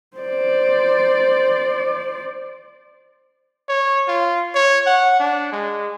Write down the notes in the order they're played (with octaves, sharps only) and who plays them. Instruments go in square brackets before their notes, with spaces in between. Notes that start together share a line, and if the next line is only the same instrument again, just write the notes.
[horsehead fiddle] C5 D5
[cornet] C#5
F4
C#5
F#5
D4
G#3